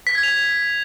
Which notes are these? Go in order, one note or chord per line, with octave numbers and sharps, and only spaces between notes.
B6
G#6
F7